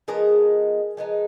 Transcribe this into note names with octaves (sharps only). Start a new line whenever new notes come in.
F3 G#3 B3 D#4 G#4 A#4
F3 G#3 B3 D#4